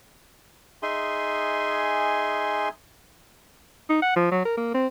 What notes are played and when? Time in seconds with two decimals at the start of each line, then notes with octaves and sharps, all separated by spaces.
0.83 D#4 G#4 E5 G#5 C6
3.90 D#4
4.02 F#5
4.16 F3
4.31 F#3
4.45 A#4
4.57 A#3
4.74 C4